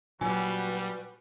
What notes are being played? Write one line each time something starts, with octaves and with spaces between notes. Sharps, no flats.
A#2 F#3 G3 F#4 B4 G#5